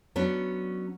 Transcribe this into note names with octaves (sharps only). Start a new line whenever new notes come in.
F#3 B3 C#4 D4